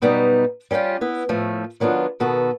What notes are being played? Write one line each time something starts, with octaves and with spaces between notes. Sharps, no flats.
F#2 B2 G3 B3 D#4
G3 C#4 E4 F4 G4
B3 E4
A2 F3 A3
D#3 F#3 B3 D4 F4
B2 D#3 B3 F#4 A4